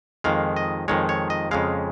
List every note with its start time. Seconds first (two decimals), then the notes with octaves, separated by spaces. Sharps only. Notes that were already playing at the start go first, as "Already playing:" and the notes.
0.24 F2 D#3 G#3 F5
0.56 D#5
0.88 F2 D#3 G#3 C#5
1.09 C#5
1.30 D#5
1.51 F2 C#3 G#3 F5